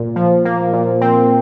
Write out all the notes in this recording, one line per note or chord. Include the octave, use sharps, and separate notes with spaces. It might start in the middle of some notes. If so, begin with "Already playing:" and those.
Already playing: A#2
F3
A#3
A#2
C4